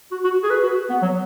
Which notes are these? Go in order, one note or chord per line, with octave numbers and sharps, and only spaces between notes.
F#4
F#4
G#4
B4
F#4
B3
F#3